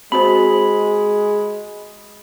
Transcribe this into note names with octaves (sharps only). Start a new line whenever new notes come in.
G#3 C4 F#4 C5 B5